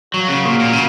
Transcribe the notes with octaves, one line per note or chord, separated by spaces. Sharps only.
F#3 F#4 A#4 F5
C#3
A#2
A#2
C#3